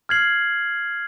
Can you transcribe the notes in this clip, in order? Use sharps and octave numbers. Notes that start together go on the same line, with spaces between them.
F6 G#6 C7 F#7